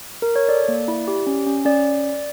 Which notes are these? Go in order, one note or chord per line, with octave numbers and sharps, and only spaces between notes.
A#4
C#5
A4 D5
A#3
E4
G4
C#4
C#4
C#4 D5